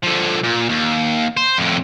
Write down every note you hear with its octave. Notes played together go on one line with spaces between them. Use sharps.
D3 F3
A#2
D#2
C5
F2 A2